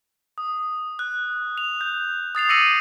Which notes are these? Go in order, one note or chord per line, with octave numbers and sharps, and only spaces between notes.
D#6
F#6
F7
G6
D#6 A6 C7 F7
D6 E6 A#6 C#7 D#7 F#7